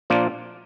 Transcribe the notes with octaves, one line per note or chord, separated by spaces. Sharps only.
A#2 F3 A#3 D4 F4